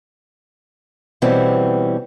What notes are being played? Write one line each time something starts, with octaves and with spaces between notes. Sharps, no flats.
B2 E3 G3 C4 C#4